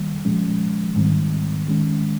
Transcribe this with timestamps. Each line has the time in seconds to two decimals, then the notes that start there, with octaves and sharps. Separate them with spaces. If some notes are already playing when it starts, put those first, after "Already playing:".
Already playing: D#3 G3 A#3
0.25 A#2 F3 G#3 C#4
0.96 G#2 D#3 G3 C4
1.66 D#3 G#3 C#4